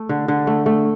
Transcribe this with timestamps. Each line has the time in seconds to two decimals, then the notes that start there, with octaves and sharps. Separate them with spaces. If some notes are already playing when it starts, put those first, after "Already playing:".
Already playing: A3
0.09 D3
0.28 D3
0.47 A3
0.66 A3